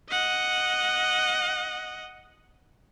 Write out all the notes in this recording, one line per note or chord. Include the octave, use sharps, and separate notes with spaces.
D#5 F#5